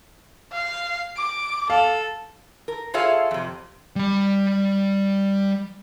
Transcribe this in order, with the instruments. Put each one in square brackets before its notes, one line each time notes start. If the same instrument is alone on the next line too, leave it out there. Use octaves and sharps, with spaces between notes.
[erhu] F5
D6
[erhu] A4 [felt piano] F5
[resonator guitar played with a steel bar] A#4
F4 G#4 A4 C#5 E5 F5
F2 C3
[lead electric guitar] G3 B5